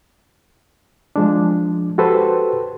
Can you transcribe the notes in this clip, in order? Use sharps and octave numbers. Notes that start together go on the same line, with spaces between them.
F3 G#3 D4
F#4 G4 A4 B4 C5